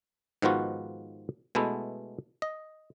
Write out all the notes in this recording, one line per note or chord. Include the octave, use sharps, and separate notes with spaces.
G#2 D#3 F3 B3 F4 F#4
B2 G#3 A3 B3 E4
D#5